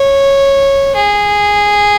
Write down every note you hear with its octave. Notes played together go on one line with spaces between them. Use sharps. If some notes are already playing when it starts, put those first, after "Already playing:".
Already playing: C#5
G#4